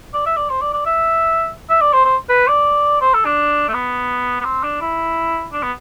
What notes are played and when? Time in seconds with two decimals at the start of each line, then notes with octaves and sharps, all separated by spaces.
0.14 D5
0.26 E5
0.37 D5
0.50 C5
0.61 D5
0.73 D5
0.86 E5
1.69 E5
1.81 D5
1.93 C5
2.05 C5
2.29 B4
2.48 D5
3.01 C5
3.14 A4
3.25 D4
3.69 A3
3.73 B3
4.41 B3
4.44 C4
4.63 D4
4.81 E4
5.53 D4
5.63 B3